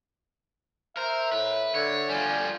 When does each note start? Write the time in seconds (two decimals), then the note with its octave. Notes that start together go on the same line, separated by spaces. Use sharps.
0.97 A#4 C5 E5
1.32 A2 B4
1.75 D3 C#5
2.10 G3 F4 G#5